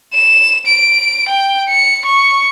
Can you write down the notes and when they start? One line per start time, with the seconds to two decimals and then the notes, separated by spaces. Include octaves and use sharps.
0.14 E7
0.66 D7
1.29 G5
1.69 C#7
2.05 C#6